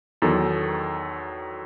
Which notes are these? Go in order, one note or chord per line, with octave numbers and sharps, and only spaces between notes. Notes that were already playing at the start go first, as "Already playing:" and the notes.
E2 D#3 F#3 A4